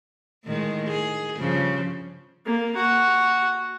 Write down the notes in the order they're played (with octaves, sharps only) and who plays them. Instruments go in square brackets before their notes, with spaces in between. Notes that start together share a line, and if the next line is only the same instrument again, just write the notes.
[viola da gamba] A2 D#3 G#3
G#4
G2 C#3 F3
[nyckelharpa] A#3
F#4